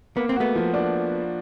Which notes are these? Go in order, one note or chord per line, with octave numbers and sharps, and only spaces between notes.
A#3 B3
C4
A3 B3 F#4
F3
D4